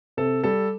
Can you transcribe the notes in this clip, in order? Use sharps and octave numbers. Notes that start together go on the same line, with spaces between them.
C3 A4
G3 A4